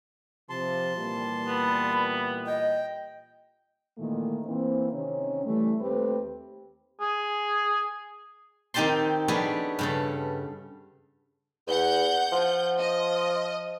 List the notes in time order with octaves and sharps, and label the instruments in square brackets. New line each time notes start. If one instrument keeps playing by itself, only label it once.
[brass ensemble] C3 F3 [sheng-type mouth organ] A5 C6
[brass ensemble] A#2 E3 G3
[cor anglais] B3 [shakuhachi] B5
[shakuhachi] D#5 [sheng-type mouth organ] G5
[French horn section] A#2 D#3 E3 A3 A#3
E3 A#3 C4
C3 D#3 C#4
E3 G3 A3
D#2 A3 C4 G4 B4
[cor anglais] G#4
[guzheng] D#3 C4 D#4 G4 A5 C6
G3 B3 C#4 D4 G#4 A4
G2 C#3 A4
[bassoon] E2 [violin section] F#5 G6
[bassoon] F3
[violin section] D#5